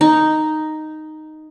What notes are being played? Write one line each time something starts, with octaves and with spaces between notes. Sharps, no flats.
D#4